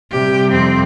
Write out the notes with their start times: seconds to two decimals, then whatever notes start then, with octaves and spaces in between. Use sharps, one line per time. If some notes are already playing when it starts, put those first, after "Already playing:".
0.12 C3 G3 G4
0.52 F2 C4